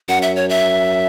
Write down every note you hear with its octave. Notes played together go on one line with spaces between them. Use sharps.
F#2 F#5
E5
C#5
E5